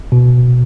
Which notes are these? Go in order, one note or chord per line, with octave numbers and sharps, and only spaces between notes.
B2